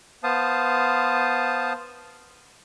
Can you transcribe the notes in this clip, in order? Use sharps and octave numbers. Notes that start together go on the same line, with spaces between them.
B3 C5 F5 A5 D#6